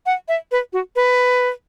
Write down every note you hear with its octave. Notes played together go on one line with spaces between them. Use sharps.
F#5
E5
B4
F#4
B4